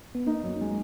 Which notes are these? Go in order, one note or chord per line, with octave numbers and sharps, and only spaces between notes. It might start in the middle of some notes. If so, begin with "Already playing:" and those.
B3
A#3 D#4
F#2
G#3